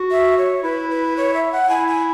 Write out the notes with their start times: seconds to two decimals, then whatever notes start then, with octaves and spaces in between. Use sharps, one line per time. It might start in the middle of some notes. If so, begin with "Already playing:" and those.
Already playing: F#4
0.11 E5
0.38 C#5
0.63 E4 B4
0.90 B4
1.17 C#5
1.34 E5
1.52 F#5
1.69 E4 G#5
1.88 G#5